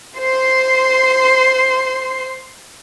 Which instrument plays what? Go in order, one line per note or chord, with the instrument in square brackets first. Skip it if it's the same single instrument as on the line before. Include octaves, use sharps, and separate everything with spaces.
[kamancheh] C5 C6